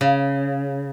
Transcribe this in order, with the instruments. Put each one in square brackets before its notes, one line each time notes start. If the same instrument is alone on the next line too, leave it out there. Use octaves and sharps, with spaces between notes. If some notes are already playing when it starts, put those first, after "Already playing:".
[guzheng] C#3